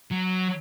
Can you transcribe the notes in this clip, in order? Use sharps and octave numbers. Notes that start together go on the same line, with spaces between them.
F#3